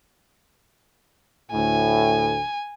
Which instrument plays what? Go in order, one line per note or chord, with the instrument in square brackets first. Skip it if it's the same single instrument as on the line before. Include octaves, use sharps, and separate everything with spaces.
[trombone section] D2 A2 [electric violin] G#5